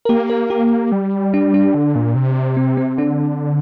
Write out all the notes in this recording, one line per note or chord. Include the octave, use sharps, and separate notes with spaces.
A#4
A#3 G4
A#4
G4
G3
D4
D4
D3
A#2
C3
C4
C4
D3 D4